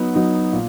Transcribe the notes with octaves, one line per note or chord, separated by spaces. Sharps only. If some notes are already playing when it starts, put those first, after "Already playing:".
Already playing: F#3 B3 D#4
F#3 B3 D#4
A#2